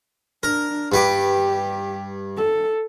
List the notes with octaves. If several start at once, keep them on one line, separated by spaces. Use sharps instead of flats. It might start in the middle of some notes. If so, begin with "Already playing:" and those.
D4 A#4
G2 G4 B4 D6
A4